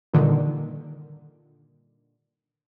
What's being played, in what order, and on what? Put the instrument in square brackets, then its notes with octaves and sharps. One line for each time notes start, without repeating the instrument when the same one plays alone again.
[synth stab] G2 A#2 D3 D#3